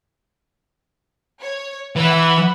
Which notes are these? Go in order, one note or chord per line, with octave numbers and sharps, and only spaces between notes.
C#5
E3 F#5 B5 E6